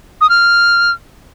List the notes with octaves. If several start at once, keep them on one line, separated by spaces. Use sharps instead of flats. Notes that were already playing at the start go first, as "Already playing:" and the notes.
D#6
F6